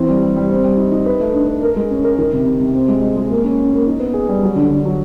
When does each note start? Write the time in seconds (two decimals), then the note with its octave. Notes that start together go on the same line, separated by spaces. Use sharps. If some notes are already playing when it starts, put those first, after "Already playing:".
Already playing: E3 C4
0.09 G3
0.22 G3
0.36 G3
0.50 C4
0.64 G3
0.78 D#4
0.92 D#4
1.06 B4
1.20 A3
1.34 D4
1.48 B4
1.63 A#4
1.76 G#3
1.91 C#4
2.04 A#4
2.18 D#3
2.33 C3
2.46 C3
2.60 C3
2.74 C4
2.88 G#3
3.02 G#3
3.17 G#3
3.31 A#3
3.44 C#4
3.58 C#4
3.73 A#3
3.87 D#4
4.00 B3
4.14 G#4
4.28 G3
4.43 F#3
4.56 D3
4.70 D3
4.85 F#3